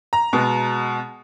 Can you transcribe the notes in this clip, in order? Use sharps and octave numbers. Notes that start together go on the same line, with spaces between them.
A#5
B2 G#3 B3